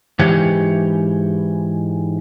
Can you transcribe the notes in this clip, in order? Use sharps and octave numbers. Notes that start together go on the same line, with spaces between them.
G#2 E3 G4 C#5